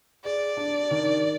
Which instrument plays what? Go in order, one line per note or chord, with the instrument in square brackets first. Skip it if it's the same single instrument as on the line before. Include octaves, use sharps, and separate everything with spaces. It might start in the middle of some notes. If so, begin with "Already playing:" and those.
[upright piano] G#4 [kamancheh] D5
[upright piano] D4
D#3